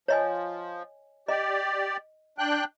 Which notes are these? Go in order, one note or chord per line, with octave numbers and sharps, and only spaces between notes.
F3 C#5 D#5 G#5
G4 D5 D#5
D4 G5 F#6